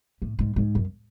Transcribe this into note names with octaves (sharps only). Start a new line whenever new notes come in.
A2
G#2
G#2
F#2